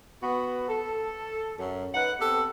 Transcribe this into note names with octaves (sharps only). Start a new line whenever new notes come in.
B3 F#4
A4
F#2
D#4 B4 F#5
B3 C4 G4 A4